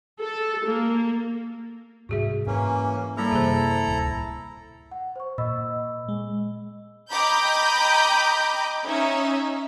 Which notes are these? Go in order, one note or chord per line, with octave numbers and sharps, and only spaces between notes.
A4
A#3
G#2 C3 G3 F#4 G#4 E5
G#2 E3 A#3 C#4
G3 A#3 E4 A4 A#5
F#2 C3 D#3 G#4 C5
D1 C2 A#3
F#5
C5 C#6
A#2 D#5 B5 E6
G#3
D#5 G5 A#5 B5 D6 G6
C#4 D#4 E5